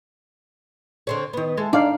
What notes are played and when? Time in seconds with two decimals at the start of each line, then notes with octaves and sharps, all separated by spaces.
1.07 D3 C4 C#5
1.33 D#3 B3
1.57 G#3 E4 A4
1.73 D4 D#4 D5 F5